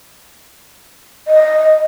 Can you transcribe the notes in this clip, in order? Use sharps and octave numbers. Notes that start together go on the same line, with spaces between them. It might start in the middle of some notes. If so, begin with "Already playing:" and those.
D#5